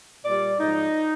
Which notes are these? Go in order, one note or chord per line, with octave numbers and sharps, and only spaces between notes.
A#2 G3 D5
G#2 F3 D#4